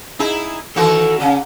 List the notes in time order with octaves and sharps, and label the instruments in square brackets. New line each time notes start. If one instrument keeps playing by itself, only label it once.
[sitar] D#4 E4 G#4
[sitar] D#3 E3 F#4 [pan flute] A4
[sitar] C#3 [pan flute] C#4